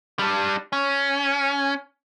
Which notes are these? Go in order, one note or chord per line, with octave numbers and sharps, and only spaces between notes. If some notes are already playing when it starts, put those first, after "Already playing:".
G3 D4
C#4